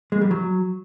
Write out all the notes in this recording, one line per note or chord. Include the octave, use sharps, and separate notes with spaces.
G#3
G3
F#3